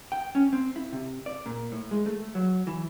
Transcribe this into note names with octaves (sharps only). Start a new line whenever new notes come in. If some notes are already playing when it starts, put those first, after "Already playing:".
G5
C#4
C4
E4
C3
D5
A#2
A2
G#3
A3
F#3
E3